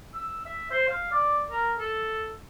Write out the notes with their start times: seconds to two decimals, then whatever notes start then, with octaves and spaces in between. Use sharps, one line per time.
0.14 E6
0.46 E5
0.71 C5
0.89 F5
1.12 D5
1.51 A#4
1.79 A4